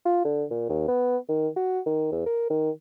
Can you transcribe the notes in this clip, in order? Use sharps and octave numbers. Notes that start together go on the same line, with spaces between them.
F4
D3
A#2
D#2
B3
D#3
F#4
D#3
E2
A#4
D#3